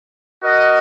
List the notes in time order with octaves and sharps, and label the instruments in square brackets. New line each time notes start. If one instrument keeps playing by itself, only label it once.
[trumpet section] F#4 A#4 D#5 F#5